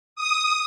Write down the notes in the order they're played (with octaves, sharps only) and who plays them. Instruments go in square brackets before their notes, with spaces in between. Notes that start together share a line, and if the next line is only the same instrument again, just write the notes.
[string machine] D#6